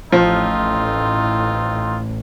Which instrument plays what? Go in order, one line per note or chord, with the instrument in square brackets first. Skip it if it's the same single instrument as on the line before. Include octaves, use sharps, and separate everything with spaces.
[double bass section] A1 A2 [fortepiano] F3 [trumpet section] C4 D#4 F4